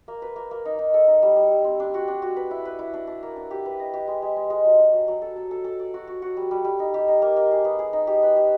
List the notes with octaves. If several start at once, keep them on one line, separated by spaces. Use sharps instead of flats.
A#3
B4
A#3
A#3
D#4
D#4
A4
D#4
G3
G3
G3
C4
D4
F#4
D4
F#4
B4
E4
B4
E4
D4
D4
A#3
D4
G4
B4
D#5
G4
G#3
G#3
G#3
G#3
F#3
D4
F#3
F#3
A4
A4
A4
A4
D5
F#4
F#4
F#4
G3
G3
G3
D#4
G4
D#4
A#3
A#3
G#4
B3
G#4
D#4
G4
B4
G4